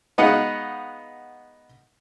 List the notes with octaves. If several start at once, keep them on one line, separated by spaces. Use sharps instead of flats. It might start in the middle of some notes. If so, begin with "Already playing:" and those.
G#3 B3 D#4 F#4 F5 F#5